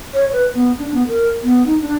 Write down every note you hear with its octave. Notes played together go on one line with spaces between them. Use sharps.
C#5
B4
B3
D4
B3
A#4
B3
D#4
D4